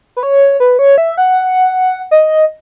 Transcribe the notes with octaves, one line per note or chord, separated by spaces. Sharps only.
B4
C#5
B4
C#5
E5
F#5
D#5